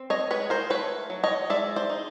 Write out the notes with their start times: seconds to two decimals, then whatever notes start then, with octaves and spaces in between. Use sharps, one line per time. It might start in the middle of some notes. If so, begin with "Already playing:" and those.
Already playing: C4
0.10 C#5 D#5
0.31 G#3 B4 C#5
0.50 A#4 C5
0.70 A3 B4 C#5
1.10 F#3
1.23 C#5 D#5
1.50 G#3 D5 E5
1.76 C5 D5
1.90 D#4